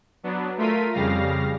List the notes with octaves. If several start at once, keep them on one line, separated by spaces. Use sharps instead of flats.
F#3 B3 D4
A3 F4 A#4 B6 D#7
F2 C#3 G3 F5 A#6